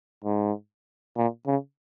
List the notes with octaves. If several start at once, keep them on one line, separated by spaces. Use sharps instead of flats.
G#2
A#2
C#3